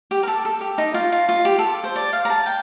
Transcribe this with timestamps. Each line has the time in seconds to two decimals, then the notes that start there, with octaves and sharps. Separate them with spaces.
0.11 G4
0.23 A#4
0.28 A4
0.45 A4
0.61 G4
0.78 D#4
0.94 F4
1.12 F4
1.29 F4
1.45 G4
1.58 A4
1.84 C5
1.96 D5
2.13 F5
2.25 A#5
2.30 A5
2.46 G5